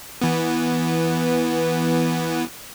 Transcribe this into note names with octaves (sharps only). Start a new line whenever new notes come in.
E3 B3